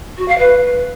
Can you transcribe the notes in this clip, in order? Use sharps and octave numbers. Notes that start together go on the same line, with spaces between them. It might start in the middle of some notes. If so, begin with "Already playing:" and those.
F#4
F5
B4